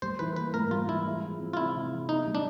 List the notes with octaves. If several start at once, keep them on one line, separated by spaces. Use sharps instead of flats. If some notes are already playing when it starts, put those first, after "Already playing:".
G3 C5
E3 B4
A#3 B4
G#2 A#4
G3 F4
E3 E4
G#3
F3
C4
F4
C3 E4
G#3
F3
B3 D#4
G3
D4